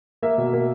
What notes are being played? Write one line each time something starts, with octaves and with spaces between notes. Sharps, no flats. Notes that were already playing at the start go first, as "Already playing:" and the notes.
A#3 E5
B2
A#3